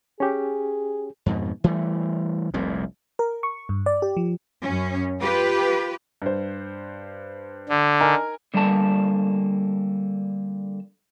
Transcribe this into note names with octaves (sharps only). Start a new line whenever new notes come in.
C#4 G4 G#4 C#5
F2 G#2 B2
E3 G3 A3
F1 C2 F2 A#2
A#4
C#6
G2
D5
G4
F3
F#2 C#4
F4 G4 B4
G2 C5
D3
D#4 A#4 G#5
D3 G3 A#3 A4 A5